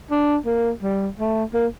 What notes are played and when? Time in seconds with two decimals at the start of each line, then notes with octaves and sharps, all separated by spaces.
0.11 D4
0.46 A#3
0.83 G3
1.19 A3
1.54 A#3